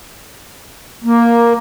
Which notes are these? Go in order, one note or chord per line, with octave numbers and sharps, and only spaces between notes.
A#3